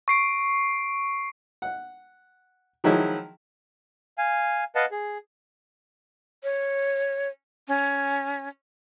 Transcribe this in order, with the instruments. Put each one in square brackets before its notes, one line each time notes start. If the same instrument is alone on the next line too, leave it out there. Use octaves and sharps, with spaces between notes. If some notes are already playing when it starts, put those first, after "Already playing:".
[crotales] C#6 C7 D7
[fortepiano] F#5
D#3 F3 F#3 G#3 E4
[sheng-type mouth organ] F5 G#5
B4 D#5 F5 F#5 A5
G#4
[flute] C#5
C#4